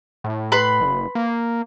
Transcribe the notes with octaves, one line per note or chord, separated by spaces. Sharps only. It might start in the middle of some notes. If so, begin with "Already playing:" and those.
A2
B4 B5 C6
F#1
A#3